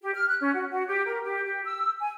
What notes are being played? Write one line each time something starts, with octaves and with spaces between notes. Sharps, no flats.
G4
F6
F#6
C#4
F#4
F#4
G4
A#4
G4
G4
E6
G#5